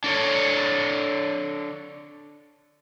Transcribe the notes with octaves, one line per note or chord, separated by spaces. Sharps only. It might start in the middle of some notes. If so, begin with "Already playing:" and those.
D4 A4 C#5